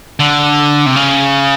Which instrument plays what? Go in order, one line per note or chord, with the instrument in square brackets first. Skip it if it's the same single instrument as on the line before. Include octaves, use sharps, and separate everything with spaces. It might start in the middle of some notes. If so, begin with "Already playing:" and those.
[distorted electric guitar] D3
C3
C#3